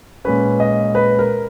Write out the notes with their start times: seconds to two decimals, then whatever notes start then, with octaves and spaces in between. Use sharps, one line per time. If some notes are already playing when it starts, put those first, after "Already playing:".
0.25 A#2 G#3 C#4 B4
0.60 D#5
0.95 B4
1.19 A#4